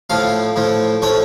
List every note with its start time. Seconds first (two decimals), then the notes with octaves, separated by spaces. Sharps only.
0.10 A2 F3 F5
0.56 A2 F3
1.02 A2 F3 C#5